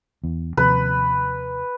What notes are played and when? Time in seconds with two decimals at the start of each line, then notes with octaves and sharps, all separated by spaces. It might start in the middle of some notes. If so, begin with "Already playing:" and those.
0.24 E2
0.57 D#2 C3 F3 B4